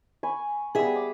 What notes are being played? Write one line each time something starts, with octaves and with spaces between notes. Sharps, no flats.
G#5 B5 C#6
G3 B3 G#4 E5
D6